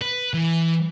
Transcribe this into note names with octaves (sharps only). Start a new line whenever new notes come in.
B4
E3